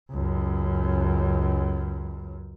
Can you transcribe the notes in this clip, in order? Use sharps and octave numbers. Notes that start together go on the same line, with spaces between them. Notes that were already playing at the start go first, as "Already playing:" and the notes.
C#2 F#2